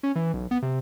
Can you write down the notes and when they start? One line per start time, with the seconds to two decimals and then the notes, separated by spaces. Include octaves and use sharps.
0.03 C#4
0.16 E3
0.34 B1
0.51 B3
0.62 C3